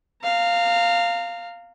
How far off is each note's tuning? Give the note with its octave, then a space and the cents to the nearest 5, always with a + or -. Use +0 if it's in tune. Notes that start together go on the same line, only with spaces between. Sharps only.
F5 +0 A#5 -35